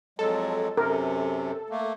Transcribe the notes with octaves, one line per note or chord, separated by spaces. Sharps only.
F2 F#3 G#3 A4
F#2 C3 A#4
A3 A#3